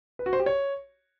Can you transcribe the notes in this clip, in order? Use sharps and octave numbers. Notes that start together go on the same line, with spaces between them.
B4
F#4
C5
G4
C#5